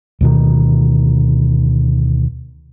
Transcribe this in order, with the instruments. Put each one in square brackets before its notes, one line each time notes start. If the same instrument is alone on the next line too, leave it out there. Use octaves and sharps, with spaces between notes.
[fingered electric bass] D2 B2 D#3